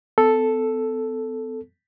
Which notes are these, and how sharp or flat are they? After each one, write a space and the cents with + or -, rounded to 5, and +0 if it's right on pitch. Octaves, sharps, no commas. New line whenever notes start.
B3 +45 A4 +0